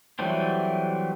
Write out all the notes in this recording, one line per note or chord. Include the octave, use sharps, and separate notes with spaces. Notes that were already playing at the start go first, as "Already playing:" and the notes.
E3 F#3 G3 A3 C4